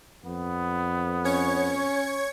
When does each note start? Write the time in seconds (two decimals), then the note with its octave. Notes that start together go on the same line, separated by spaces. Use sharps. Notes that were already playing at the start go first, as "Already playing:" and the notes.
0.25 F2 B3
1.25 C#4 C#5 G#6 C#7